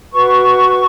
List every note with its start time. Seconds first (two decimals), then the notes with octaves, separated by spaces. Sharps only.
0.12 F#4 B4 C#6